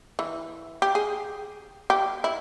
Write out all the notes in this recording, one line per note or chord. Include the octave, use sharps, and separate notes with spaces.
E3
G4
G#4
G4
E4